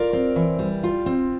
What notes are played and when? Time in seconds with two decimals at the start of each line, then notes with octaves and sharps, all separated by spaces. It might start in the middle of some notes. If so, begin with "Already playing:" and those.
Already playing: F4 A#4 D5
0.13 C4
0.36 E3
0.59 G3
0.83 F4
1.06 C4